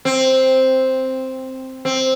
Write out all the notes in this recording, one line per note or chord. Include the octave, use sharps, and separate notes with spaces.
C4
C4